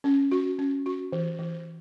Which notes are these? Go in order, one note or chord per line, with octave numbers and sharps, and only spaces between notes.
C#4
F#4
C#4
F#4
E3
E3